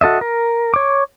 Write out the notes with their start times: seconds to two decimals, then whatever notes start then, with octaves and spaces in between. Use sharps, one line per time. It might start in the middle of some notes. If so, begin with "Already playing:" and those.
0.01 F#4 A4 D#5 E5
0.21 A#4
0.74 C#5 D6